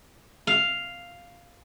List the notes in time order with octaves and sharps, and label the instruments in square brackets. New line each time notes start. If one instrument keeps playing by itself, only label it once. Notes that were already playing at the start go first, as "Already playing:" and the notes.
[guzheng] F5